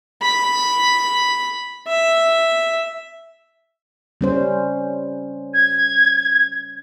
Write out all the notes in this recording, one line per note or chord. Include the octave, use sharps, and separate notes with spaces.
B5
E5
G3 C#4 C5
G#6